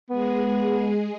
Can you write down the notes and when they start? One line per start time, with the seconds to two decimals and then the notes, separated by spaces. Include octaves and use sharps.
0.10 G#3 B3 G#4